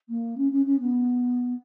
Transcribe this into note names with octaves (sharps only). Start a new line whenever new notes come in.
A#3
C#4
C#4
C#4
B3